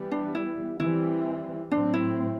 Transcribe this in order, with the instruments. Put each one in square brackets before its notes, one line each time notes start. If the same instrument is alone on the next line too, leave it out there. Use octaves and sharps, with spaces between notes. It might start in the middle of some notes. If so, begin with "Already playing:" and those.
Already playing: [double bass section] E3 G3 B3
[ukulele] D4
E4
[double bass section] E3 G3 C4 [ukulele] E4
[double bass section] A2 F#3 C4 [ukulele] D4
[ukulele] E4